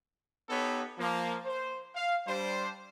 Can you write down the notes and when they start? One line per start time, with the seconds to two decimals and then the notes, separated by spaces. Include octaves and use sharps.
0.49 B3 D#4 G4 A4 B4 C#5
0.98 F3 A#3
1.45 C5
1.95 F5
2.27 G3 D4 C5